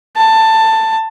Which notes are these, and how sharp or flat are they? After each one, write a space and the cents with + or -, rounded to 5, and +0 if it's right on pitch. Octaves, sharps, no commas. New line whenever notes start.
A5 +15